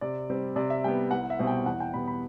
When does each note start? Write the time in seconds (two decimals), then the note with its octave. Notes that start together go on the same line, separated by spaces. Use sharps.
0.01 C3 D5
0.30 G3 C4
0.56 C3 D5
0.70 E5
0.84 G3 B3 G5
1.11 C2 F#5
1.30 E5
1.39 B2 G3 C4
1.47 G5
1.66 E2 F#5
1.80 G5
1.94 B2 G3 B3 B5
2.07 B5